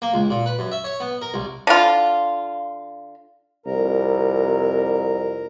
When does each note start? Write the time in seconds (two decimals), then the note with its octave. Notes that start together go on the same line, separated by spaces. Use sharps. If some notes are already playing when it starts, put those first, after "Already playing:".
0.02 A#3
0.14 C#2
0.30 A#2
0.46 B4
0.59 F#2
0.72 E5
0.84 C#5
1.00 B3
1.22 A#4
1.34 C2
1.67 D3 F4
3.66 C2 F2 A#4 A#5